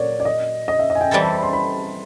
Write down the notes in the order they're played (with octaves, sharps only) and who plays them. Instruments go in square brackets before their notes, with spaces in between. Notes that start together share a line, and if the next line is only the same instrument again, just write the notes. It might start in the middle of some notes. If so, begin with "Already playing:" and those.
Already playing: [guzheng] A#2 F#3 [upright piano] C#5 D5
[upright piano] D5
D#5
D#5
E5
D#5
G#5
G5
[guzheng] E3 G3 C4 E4 A4
[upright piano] A5
B5
C6
B5